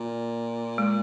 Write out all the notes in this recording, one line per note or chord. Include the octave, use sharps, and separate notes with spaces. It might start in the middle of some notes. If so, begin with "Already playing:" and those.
Already playing: A#2
G#3